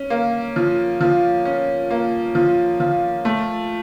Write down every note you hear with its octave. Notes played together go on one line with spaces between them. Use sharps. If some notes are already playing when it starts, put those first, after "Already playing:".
Already playing: C#4
A#3
F3
F3
C#4
A#3
F3
F3
A3